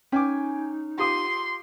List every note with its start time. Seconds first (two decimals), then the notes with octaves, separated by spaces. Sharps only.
0.12 C#4 D#4 G5 G#5 D6
0.99 F4 G4 C6 D#6